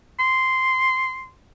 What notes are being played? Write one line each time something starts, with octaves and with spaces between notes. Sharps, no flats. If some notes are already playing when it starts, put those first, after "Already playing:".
C6